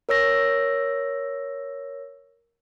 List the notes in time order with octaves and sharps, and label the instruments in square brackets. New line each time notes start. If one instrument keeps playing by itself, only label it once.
[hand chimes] A#4 C#5 E6 A#6